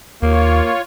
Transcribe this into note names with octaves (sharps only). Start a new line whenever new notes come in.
D#2 A#3 F4 C#5